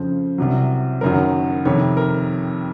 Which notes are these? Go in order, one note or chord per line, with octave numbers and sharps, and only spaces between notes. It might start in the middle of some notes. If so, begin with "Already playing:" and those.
Already playing: F2 C#3 F3 C5
C2 C3 F#3
F#1 F#2 D#3 F#3 A#4
F2 C3 D#3 C#5
A#4